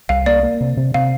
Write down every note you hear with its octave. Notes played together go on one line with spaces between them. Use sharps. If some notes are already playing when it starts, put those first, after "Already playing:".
C2 F5
A#3 D5
A#3
C3
C3
C3 F5